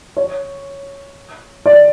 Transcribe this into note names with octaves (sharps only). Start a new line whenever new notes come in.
C#5
D5